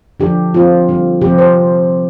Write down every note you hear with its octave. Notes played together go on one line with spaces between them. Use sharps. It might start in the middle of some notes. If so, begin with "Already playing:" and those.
D3 F3 D4 G4
F3 C4 F4
D3 G3 C4
C3 F3 C4 G4
C5